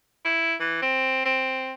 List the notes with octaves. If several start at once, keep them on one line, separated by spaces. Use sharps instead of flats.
E4
E3
C4
C4